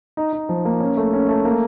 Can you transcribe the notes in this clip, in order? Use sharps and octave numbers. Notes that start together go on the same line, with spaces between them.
D#4
D#4
F3
A#3
C#4
A3
C#4
A3
A#3